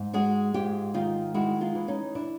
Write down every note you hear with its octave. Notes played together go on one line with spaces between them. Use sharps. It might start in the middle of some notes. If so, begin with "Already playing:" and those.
Already playing: G#2
G#3 F#4 G#4
G#2 F4 G4
D#3 D#4 F4
G#3 E4 F#4
D#4 F4
E3
C#4 D#4
D4 E4